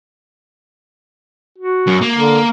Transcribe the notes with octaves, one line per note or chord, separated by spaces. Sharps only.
F#4
F#2
A#3
D3